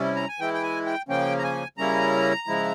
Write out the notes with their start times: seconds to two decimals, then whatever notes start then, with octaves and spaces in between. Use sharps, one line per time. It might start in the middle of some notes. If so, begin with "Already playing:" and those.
Already playing: C3 G3 C#4 E4
0.16 A#5
0.28 G#5
0.39 E3 G#3 E4 G5
0.54 G5
0.63 G#5
0.86 G5
1.09 C#3 F3 A#3 C#4 G5
1.38 A#5
1.44 G#5
1.78 C#3 G3 A#3 C#4 E4 A#5
2.48 C#3 F3 G#3 E4